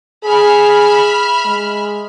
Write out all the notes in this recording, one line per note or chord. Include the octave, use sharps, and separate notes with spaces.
G#4 E5 B5 F6
G#3